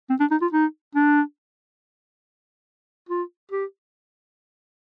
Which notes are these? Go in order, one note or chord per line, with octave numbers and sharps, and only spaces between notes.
C4
D4
D#4
F4
D#4
D4
F4
G4